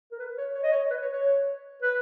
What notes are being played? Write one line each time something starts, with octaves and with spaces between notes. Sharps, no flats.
A#4
B4
C#5
C#5
D#5
C#5
B4
C#5
C#5
B4